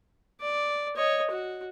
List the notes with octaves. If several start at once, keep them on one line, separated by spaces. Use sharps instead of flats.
D5
C#5 D#5
F#4